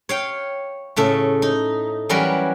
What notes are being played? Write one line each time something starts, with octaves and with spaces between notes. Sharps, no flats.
C#5 F5 G5
A2 C#3 A3 A4
D#4
E3 F#3 G3 C#4 A#4 B4